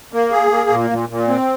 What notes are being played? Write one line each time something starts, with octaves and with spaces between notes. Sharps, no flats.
A#3
G#4
A#3
A#2
A#2
A#2
C4